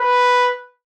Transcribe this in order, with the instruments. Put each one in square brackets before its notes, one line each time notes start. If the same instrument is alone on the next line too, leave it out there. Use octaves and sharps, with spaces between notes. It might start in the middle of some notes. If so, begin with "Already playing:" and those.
Already playing: [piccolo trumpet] B4